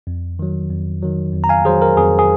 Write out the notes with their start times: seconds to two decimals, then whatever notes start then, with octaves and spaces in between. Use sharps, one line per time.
0.07 F2
0.39 D#3 F#3
0.71 F2
1.02 D#3 F#3
1.33 F2
1.44 A#5
1.49 F5 G#5
1.65 D#3 F#3 G#4 C5
1.82 A#4
1.97 F2 G#4
2.19 G#4